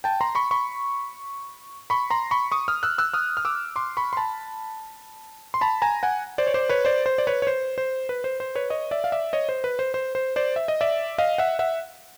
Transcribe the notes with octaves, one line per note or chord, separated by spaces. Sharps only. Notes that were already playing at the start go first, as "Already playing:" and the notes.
G5 A5
A#5 C6
B5 C#6
B5 C#6
B5 C#6
A#5 C6
B5 C#6
C#6 D#6
D#6 F6
E6 F#6
E6 F#6
D#6 F6
F6
D6 E6
C6 D6
B5 C#6
C6
A5 B5
C6
A5 B5
G#5 A#5
F#5 G#5
C5 D5
C#5
C5 D5
B4 C#5
C5 D5
C5
D5
B4 C#5
C#5
C5
C5
B4
C5
C5
B4 C#5
C#5 D#5
D5 E5
F5
D5 E5
C#5 D#5
C5
B4
C5
C5
C5
C5 D5
E5
D#5
D5 E5
D#5 F5
E5 F#5
E5 F#5